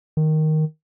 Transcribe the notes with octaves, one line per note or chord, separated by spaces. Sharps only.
D#3